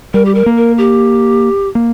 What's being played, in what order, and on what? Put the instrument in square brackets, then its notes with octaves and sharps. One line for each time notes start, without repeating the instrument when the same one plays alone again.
[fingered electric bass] G3 [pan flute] A#4
[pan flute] G4
A#4
[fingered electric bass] A#3
[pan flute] A#4
G4
[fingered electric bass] A#3